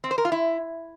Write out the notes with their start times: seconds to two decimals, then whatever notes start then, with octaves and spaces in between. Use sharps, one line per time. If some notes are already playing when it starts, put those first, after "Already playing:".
0.04 C4
0.11 C5
0.18 A#4
0.25 F4
0.32 E4